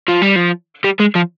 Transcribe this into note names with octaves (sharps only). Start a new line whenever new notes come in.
F3
G3
F3
G3
G#3
F3